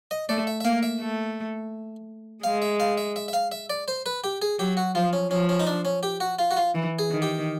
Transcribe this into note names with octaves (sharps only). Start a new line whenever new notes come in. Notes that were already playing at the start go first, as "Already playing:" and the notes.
D#5
A3 D5
E5
E5
A#3 F5
E5
A3
G#3 F5
E5
F5
E5
E5
E5
F5
E5
D5
C5
B4
G4
G#4
F#3 G4
F#4
F3 F4
C#4
F3 C#4
C#4
D#4
D4
C#4
G4
F#4
F4
F#4
F4
E3
G#4
D#3
G4